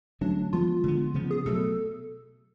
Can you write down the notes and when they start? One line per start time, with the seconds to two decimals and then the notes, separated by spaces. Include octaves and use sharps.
0.21 D3 F#3 A3 C#4 D4
0.53 F3 G#3 B3 F4
0.84 D3 G#3 B3
1.14 C#3 F3 B3
1.31 G#4
1.46 B2 F#3 A3 A4